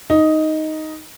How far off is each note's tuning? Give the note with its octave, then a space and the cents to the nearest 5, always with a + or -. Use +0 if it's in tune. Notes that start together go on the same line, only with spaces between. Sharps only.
D#4 +5